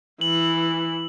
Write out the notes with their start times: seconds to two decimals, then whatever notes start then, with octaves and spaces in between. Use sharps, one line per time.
0.21 E3 F#7